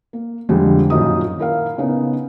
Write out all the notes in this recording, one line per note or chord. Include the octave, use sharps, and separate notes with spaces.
A#3
F2 D3 G3 G#3
F#2 A#2 D#3 D#4 D#6
E4 A#4 F5
C#3 B3 D#4